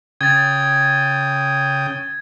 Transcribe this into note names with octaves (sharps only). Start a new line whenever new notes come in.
C#3 G5 D#6 G#6 A6